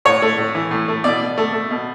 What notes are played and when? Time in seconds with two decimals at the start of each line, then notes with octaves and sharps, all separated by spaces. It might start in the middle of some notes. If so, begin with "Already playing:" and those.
0.05 A2 C#5
0.22 A3
0.38 A2
0.55 E3
0.71 A2
0.88 A3
1.04 B2 D5
1.21 B2
1.38 A3
1.53 A3
1.71 B2